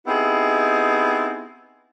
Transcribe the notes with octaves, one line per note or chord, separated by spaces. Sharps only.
B3 C4 D#4 E4 G4 G#4